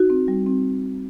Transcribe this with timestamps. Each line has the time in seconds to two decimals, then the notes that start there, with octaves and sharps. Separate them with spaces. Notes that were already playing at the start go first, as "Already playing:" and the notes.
Already playing: D#4 F#4
0.10 C4
0.28 G3
0.46 C4